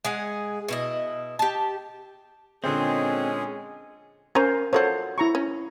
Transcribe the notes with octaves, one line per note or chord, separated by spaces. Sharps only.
G#3 G#4 F#5
B2 E4 D#5
G4 A5
A#2 D3 G#3 C4 C#4 G#4 C5
C#4 A#4 C5 G#5 A#5
F3 F#3 F#4 A4 C5 C#5
E4 A#5 C#6
C#4